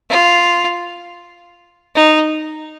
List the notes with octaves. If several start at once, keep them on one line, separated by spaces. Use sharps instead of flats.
F4
D#4